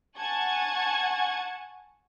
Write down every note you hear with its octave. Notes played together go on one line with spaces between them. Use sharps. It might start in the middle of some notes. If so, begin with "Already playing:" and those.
F#5 G#5 A5 C#6 G#6